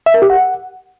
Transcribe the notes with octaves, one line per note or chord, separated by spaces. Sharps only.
E5
A#4
G4
F#5